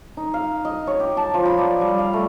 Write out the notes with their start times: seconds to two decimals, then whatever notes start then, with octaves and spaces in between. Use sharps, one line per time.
0.17 D#4
0.34 F5
0.65 D#5
0.87 C#5
1.00 G4
1.17 A5
1.34 F3
1.45 B5
1.58 D5
1.81 G3
1.99 F5
2.13 A3